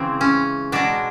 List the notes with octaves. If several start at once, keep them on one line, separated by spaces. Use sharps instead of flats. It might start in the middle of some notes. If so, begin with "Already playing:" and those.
Already playing: C#3 E3 G#3 C4
C#4
B2 G#3 D4